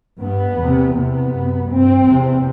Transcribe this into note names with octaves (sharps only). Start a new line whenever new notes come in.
G2 B3
E2 C3
E2 C3 B3
F#2
G2 C4
E2 C3